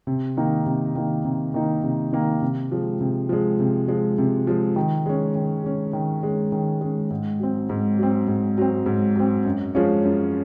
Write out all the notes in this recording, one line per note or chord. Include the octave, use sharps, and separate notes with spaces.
C3
D#3 A#3 D#4
C3
D#3 A#3 D#4
C3
D#3 A#3 D#4
C3
D#3 A#3 D#4
C3
F3 G#3
C3
F3 G#3
C3
F3 G#3
C3
F3 G#3
D#3
G#3 C#4
D#3
G#3 C#4
D#3
G#3 C#4
D#3
G#3 C#4
G#2
F#3 C4
G#2
F#3 C4
G#2
F#3 C4
G#2
F#3 C4
F#2
F3 G#3 C#4 F4
F#2